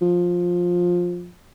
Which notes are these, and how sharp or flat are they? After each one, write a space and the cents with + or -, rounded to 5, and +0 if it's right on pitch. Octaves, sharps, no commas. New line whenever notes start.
F3 +15